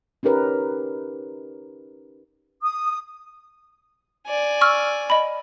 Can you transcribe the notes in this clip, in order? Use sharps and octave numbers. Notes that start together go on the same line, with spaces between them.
C#4 D#4 G4 A#4 B4
D#6
D5 G#5
C#6 E6 F6
D#5 B5